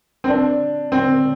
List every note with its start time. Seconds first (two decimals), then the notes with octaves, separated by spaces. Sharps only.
0.24 C4
0.28 D4
0.92 C4